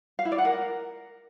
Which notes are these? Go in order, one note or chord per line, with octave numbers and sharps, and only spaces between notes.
F5
E4
D5
F#5
A#4